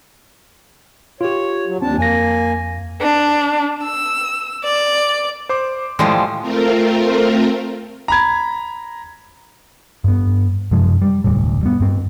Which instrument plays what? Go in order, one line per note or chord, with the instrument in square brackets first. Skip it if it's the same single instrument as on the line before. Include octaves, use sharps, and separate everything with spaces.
[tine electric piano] F4 G4 [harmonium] C#5
[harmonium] F#3
[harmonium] D#2 D4 A5 [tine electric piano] C4
[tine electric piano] F2 A#6 [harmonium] A#3 G#5
[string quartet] D4
E6
D5
[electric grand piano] C5 C6 D6
[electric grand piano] A2 [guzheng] F3 G3 G#3
[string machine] A3 C4 F4 A#4
[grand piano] A#5 B5 G#6
[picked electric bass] G2 B3
F#2 C3 F3 G#3
G3
F1 D2 A2
G3 B3
G2 C4